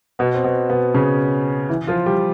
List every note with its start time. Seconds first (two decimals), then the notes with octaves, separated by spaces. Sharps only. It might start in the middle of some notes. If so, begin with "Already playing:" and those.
0.19 B2 B3
0.34 C4
0.44 B2 B3
0.70 B2 B3
0.94 C#3 C#4
1.69 E3 E4
1.87 F3 F4
2.06 G3 G4